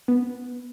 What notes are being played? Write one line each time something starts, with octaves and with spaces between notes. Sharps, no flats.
B3